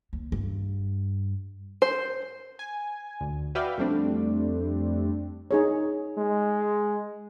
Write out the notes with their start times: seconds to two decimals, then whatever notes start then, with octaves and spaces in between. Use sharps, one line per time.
0.13 D#2
0.32 G2
1.82 C5
2.59 G#5
3.21 D2
3.55 F#4 B4 D5 E5 F5 G5
3.78 F2 G3 A3 C4 D4
5.51 D#4 G#4 C#5
6.17 G#3